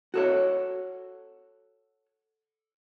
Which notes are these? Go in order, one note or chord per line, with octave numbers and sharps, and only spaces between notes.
F#4 A4 C#5